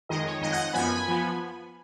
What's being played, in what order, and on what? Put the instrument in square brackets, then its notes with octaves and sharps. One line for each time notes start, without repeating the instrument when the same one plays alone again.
[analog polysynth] F2 D#3 G#3 D#5
C#5
F2 D#3 G#3 D#5
D#5 F#5
F#2 F3 B3 G#5 B5
F3 B3